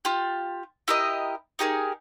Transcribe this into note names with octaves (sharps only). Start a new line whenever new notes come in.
F4 G4
E4 G4 A#4 D#5
D#4 G4 G#4 A#4